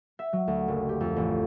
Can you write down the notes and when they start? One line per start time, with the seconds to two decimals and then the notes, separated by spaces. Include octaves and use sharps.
0.19 E5
0.33 F#3
0.47 D2
0.68 F#1
0.89 G4
1.00 F2
1.16 A1